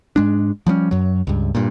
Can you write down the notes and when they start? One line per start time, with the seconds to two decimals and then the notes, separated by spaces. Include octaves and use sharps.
0.16 G#2 G#3 D4
0.67 F3 G3 B3 C#4
0.91 F#2 F#3
1.27 C#2 G2
1.55 G2 A#2